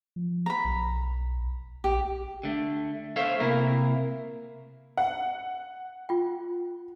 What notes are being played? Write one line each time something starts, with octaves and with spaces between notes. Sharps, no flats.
F3
A#5 B5
B1
A#1 G4
D3 A3
A4 C5 C#5 E5 F5
C3 A#3 E4 A#4
F#5
F4 G5